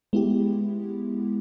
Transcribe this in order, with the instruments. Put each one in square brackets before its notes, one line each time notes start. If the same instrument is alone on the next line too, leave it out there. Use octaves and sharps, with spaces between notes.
[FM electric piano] G#3 B3 E4 G4